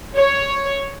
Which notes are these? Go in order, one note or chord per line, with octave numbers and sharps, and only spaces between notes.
C#5